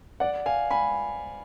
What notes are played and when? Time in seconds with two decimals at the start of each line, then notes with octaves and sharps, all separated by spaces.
0.20 D5 F#5
0.46 F5 G#5
0.71 G#5 B5